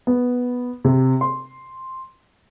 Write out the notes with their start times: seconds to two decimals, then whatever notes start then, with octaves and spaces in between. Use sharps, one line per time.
0.07 B3
0.85 C3
1.21 C6